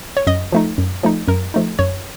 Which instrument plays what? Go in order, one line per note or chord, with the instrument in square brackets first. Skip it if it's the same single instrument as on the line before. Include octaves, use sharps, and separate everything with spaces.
[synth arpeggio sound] C#5
F#2 D#5
F3 A3 D#4
F#2
F3 A3 D#4
F#2 A#4
F3 A3 D#4
F#2 C#5